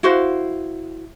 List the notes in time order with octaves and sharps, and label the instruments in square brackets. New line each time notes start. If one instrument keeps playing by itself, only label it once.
[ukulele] E4 F#4 C5 F5